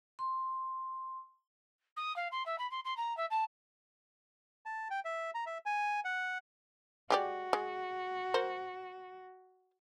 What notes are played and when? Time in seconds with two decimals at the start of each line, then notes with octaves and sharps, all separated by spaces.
0.19 C6
1.96 D#6
2.16 F5
2.32 C6
2.46 E5
2.58 B5
2.71 C6
2.85 C6
2.97 A#5
3.17 E5
3.30 A5
4.66 A5
4.90 G5
5.05 E5
5.35 A#5
5.46 E5
5.66 G#5
6.05 F#5
7.10 G#3 F#4 G4 D5
7.53 G#3
8.34 A#4 C5